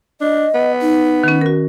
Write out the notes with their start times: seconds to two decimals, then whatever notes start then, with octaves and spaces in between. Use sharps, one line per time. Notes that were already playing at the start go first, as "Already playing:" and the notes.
0.21 D4 D#5
0.54 B3
0.82 D#4
1.24 D#3 C#4
1.41 F#4 A#4